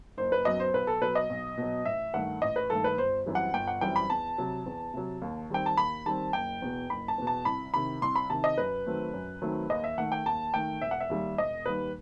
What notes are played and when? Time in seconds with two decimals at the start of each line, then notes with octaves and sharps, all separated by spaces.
0.17 F#1 C5
0.32 B4
0.45 F#2 F#3 B3 D#5
0.60 C5
0.74 B1 B4
0.87 A4
1.01 B2 F#3 B4
1.15 D#5
1.30 B1
1.57 B2 F#3
1.85 A1 E5
2.14 G2 D#3 A3 F#5
2.42 A1 D#5
2.56 B4
2.70 G2 D#3 A3 A4
2.84 B4
2.98 G1 C5
3.26 F#2 E3 G3 C4
3.35 F#5
3.54 G1 G5
3.68 F#5
3.81 F#2 E3 G3 C4 G5
3.96 B5
4.10 E2 A5
4.38 C3 F#3
4.66 E2
4.94 C3 F#3
5.22 D#2
5.50 D#3 G3 C4 G5
5.66 A5
5.77 D#2 B5
6.06 D#3 G3 C4 A5
6.33 F#1 G5
6.62 E2 B2
6.90 F#1 B5
7.08 A5
7.18 E2 B2
7.27 A5
7.45 C2 B5
7.74 C3 D#3 B5
8.02 C2 C6
8.16 B5
8.30 C3 D#3 A5
8.44 D#5
8.58 F#2 B4
8.86 D#3 F#3 A3 C4
9.13 F#2
9.42 D#3 F#3 A3 C4
9.70 D#2 D#5
9.84 E5
9.98 D#3 A3 F#5
10.12 G5
10.26 D#2 A5
10.53 D#3 A3 G5
10.81 E1 E5
10.91 F#5
11.00 E5
11.10 D#2 D#3 G3
11.38 E1 D#5
11.66 D#2 D#3 G3 B4